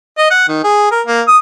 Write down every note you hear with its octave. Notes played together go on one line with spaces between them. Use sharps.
D#5
F#5
D#3
G#4
A#4
A#3
D#6